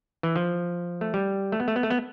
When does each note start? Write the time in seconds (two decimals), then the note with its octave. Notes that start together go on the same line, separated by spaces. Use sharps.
0.23 E3
0.36 F3
1.01 A3
1.14 G3
1.52 A3
1.60 B3
1.68 A3
1.76 B3
1.83 A3
1.90 B3